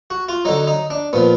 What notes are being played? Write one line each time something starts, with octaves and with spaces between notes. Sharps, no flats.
F#4
F4
D3 F#3 D#4
D#4
D4
A#2 F3 B3